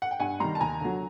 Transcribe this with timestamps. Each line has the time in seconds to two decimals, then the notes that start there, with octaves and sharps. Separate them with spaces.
0.02 F#5
0.11 G5
0.20 G2 F#5 G#5
0.40 D#3 G3 A#5 C6
0.55 A5
0.60 D#2 G#5 A#5
0.81 D3 F#3